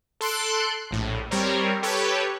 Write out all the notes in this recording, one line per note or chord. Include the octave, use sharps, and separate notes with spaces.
A4 C6 F#6 D7
A#1 A2
G3 C4 A#4 C#5
G4 A4 B4 C#5